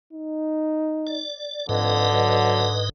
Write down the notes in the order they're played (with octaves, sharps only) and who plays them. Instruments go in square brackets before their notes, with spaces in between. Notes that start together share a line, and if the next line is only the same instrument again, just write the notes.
[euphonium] D#4
[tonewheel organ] D5
[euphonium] F2 [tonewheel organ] G#2 B4 D#5 [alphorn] D3
[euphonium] F#3